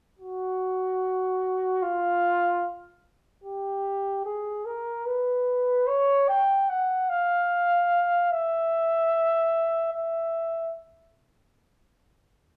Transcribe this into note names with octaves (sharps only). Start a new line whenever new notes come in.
F#4
F4
G4
G#4
A#4
B4
C#5
G5
F#5
F5
E5
E5